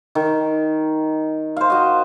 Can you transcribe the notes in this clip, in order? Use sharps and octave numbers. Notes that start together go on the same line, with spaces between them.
D#3
C5 F5
F#4 D#5